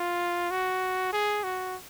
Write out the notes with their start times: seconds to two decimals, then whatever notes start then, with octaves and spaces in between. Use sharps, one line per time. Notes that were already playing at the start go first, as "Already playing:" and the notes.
Already playing: F4
0.51 F#4
1.12 G#4
1.44 F#4